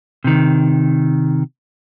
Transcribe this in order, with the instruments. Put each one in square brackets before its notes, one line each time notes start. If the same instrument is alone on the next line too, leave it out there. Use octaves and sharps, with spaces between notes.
[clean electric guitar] C3 D#3